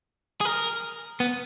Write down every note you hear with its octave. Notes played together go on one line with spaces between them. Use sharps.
G#4
A#4
B3